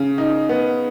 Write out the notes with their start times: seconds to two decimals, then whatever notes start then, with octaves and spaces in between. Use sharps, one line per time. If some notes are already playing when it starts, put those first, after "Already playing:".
Already playing: C#3
0.18 D#4
0.49 B3